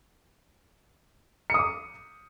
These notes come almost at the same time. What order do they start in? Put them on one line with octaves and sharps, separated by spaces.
C#7 D#6 D6